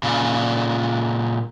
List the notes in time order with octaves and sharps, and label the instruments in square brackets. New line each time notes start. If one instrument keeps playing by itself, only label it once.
[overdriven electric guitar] A#2 C#3